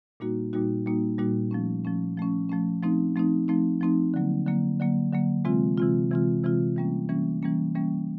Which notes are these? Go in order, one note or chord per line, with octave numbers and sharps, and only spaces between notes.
A#2 G3 A#3 D#4 F#4
A#2 G3 A#3 D#4 F#4
A#2 G3 A#3 D#4 F#4
A#2 G3 A#3 D#4 F#4
F3 A3 C#4
F3 A3 C#4
F3 A3 C#4
F3 A3 C#4
F3 A3 C4 D#4
F3 A3 C4 D#4
F3 A3 C4 D#4
F3 A3 C4 D#4
D3 F#3 A#3
D3 F#3 A#3
D3 F#3 A#3
D3 F#3 A#3
C3 E3 G#3 C4 F4
C3 E3 G#3 C4 F4
C3 E3 G#3 C4 F4
C3 E3 G#3 C4 F4
E3 G3 A#3 C#4
E3 G3 A#3 C#4
E3 G3 A#3 C#4
E3 G3 A#3 C#4